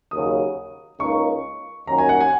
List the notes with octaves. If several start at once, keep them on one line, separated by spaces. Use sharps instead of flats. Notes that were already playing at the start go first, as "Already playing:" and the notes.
D#2 C#3 F#3 D#6
C#2 C#3 A#3 D#4 C#6
D#2 D#3 F#3 C#4 A#5
G#5
F#5
G#5